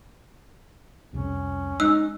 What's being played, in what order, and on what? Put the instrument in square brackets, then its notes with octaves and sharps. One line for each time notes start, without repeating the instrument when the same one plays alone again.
[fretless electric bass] C2 F2 C3 [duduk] C#4
[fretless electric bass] G#3 [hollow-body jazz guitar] D#4 [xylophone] E6 F#6